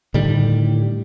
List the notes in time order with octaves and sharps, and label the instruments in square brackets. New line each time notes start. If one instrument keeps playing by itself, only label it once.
[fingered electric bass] A2 D3 D#3 G3